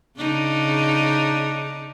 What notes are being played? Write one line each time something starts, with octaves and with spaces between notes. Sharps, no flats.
C#3 D4 D#4